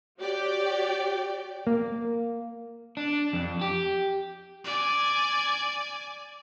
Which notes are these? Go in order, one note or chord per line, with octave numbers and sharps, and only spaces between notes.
F#4 G4 C#5 D5 G5
A#3
D4
F2
G4
D5 G#5